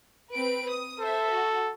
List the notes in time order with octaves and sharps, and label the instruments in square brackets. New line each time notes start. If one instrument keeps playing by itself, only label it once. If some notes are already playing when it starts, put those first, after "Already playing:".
[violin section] C4 B4 D7
D#6
[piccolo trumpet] A4 [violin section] C5 E5
[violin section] F#4